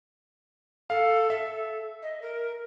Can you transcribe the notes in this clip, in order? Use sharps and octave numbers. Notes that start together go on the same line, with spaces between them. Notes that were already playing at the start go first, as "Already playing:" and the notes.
A4 F5
A4 E5
D#5
A#4